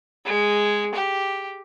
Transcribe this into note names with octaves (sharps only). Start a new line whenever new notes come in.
G#3
G4